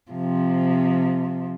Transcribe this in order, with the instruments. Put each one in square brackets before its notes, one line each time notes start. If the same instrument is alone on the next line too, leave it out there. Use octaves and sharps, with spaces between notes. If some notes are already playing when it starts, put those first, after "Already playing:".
[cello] C3 F3